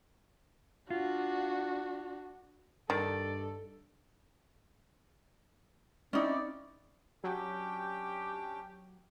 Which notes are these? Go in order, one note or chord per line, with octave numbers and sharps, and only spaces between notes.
D4 F4 F#4
G2 D#3 A4 D5
C4 C#4 D#4 E4 D5
F#3 C#4 D4 G4 G5